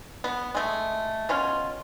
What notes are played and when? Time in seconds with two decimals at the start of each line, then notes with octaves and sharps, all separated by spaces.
0.24 B3
0.55 G#3 A3
1.29 B2 C#4 F4